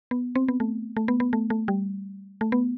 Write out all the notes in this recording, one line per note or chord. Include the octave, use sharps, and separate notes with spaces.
B3
C4
B3
A3
A3
B3
B3
A3
A3
G3
A3
B3